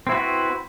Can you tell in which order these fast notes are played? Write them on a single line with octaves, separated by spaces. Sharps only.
C4 E4 F#4 B4